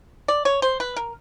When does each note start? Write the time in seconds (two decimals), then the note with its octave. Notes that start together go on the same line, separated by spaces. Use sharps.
0.28 D5
0.45 C#5
0.62 C5
0.80 B4
0.96 A#4